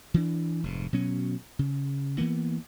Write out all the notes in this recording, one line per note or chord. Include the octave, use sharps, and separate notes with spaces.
E3 D4
F1 G#2
B2 F#3 C#4
C#3
E3 A#3 B3